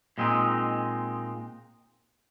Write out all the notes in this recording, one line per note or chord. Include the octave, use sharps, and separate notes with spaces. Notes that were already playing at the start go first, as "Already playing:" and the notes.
A#2 G#3 C4 D#4